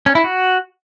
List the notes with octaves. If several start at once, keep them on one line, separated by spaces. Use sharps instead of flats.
C#4
E4
F#4